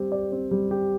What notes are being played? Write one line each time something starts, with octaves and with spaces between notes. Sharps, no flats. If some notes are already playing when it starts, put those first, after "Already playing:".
Already playing: G3 C4 G4
D5
C4
G3
G4